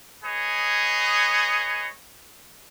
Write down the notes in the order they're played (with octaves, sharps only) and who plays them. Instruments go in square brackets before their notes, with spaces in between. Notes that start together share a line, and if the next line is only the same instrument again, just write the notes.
[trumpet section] G#4 B4 C#5 D#5